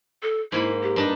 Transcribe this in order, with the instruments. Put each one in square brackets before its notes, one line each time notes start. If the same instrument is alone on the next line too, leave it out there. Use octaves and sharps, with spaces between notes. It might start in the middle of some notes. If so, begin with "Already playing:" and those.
[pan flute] A4
[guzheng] G#2 A#3 B5 [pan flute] E4
[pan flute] G4
[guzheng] G2 D4 D#4